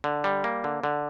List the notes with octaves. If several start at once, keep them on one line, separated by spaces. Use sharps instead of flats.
D3
G3
A#3
D3
D3